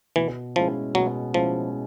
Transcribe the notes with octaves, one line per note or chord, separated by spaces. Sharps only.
B2 E3
F3 G#3 C#4 E4
B2 F#3
F3 G#3 C#4 E4